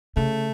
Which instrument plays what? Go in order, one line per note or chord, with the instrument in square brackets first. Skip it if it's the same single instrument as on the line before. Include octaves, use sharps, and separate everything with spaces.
[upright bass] C#3 [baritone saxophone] A3